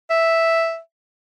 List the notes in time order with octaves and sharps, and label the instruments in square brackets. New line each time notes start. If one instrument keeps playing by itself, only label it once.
[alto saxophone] E5